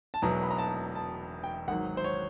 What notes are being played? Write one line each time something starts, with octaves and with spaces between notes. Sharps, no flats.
A5
E1 E2 B2 F#3 A#5
B5
A#5
A5
A5
G5
G#1 G#2 D#3 F#3 F#5
C5
C#5